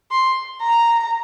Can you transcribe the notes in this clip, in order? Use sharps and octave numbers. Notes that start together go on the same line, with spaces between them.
C6
A#5